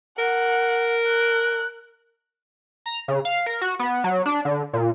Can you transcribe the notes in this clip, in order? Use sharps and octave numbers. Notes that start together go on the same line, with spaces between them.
A#4 F#5
F#6
A#5
C#3
F5
A#4
F#4
B3
F#3
D4
D3
A#2